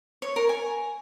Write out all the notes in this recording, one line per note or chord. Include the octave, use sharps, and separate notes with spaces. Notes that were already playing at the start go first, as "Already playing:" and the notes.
C#5
A#4
G#5